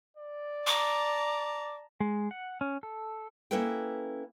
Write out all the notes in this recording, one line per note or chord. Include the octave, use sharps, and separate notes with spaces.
D5
A5 A#5 D6
G#3
F#5
C#4
A4
A#3 C#4 E4 A4 B4 G5